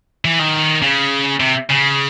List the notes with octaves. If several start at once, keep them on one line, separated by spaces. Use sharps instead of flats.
E3
D#3
C#3
C3
C#3